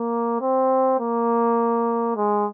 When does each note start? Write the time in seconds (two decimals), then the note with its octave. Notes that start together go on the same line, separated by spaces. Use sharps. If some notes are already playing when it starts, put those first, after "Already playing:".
Already playing: A#3
0.41 C4
0.99 A#3
2.16 G#3